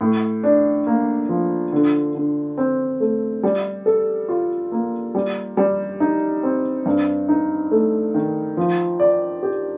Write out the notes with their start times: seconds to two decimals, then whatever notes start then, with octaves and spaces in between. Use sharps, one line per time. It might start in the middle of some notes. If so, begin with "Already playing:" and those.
0.01 A2
0.43 D4
0.86 A#3
1.29 F3
1.72 D3
2.15 D3
2.58 C4
3.00 A3
3.43 G3
3.86 A4
4.29 F4
4.72 A#3
5.15 G3
5.57 G3
6.00 D#4
6.43 C4
6.86 G2
7.28 D#4
7.71 A3
8.14 D#3
8.57 F3
9.00 D5
9.43 G4